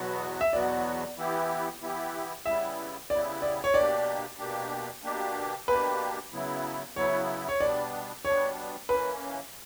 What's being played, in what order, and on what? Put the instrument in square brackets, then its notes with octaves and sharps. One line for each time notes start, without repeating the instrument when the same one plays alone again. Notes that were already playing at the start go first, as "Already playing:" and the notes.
Already playing: [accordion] E2 B2 F#3 B3 F#4
[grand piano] E5
[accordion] E2 B2 F#3 B3 F#4 [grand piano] D5
[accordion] E3 B3 E4 G4
E3 B3 E4 G4
[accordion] C#3 G3 B3 E4 [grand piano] E5
[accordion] C#3 G3 B3 E4 [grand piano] D5
[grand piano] D5
C#5
[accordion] B2 A#3 D4 G4 [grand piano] D5
[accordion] B2 A#3 D4 G4
B2 A#3 D4 G4
[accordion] B2 A#3 D4 G4 [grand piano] B4
[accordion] C#3 F#3 B3 E4
[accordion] C#3 F#3 B3 E4 [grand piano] C#5
[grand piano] C#5
[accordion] B2 G3 B3 D4 [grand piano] D5
[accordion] B2 G3 B3 D4 [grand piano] C#5
[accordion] E3 A#3 C#4 [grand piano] B4